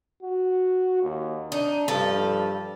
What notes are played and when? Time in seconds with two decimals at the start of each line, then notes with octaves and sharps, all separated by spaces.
0.23 F#4
1.03 D#2
1.52 D4 D#4
1.88 G2 F3 A4